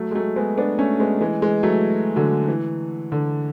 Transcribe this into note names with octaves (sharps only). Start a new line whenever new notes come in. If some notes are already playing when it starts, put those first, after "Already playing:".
Already playing: F#3 A3
G#3
F#3 A3
G#3 B3
B3 D4
A3 C#4
G#3 B3
E3 G#3
E3 G#3
F#3 A3
D3 F#3
E3
D3